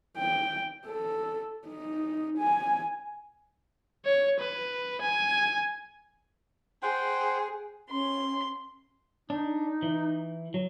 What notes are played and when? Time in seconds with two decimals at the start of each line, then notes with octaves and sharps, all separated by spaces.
0.18 G5
0.87 A4
1.67 D#4
2.39 G#5
4.05 C#5
4.40 B4
5.01 G#5
6.83 G#4 C5 F#5 G5
7.91 C#4 C6
9.30 D4 D#4
9.82 E3
10.54 F#3